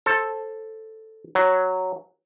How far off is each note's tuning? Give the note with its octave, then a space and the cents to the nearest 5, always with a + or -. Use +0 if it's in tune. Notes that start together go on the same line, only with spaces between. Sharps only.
A4 +0 C5 +25
F#3 +0 C#5 +0